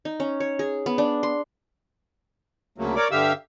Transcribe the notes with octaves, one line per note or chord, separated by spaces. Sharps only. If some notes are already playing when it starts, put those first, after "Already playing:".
D#4
C#4
C#5
G#4
B3
D4
C6
D2 C#3 F#3 A3 A#3
A#4 C#5 D5 D6
G2 D3 G4 E5 F5 E6